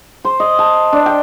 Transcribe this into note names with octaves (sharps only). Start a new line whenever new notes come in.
C5
D#5
A5
D4
G5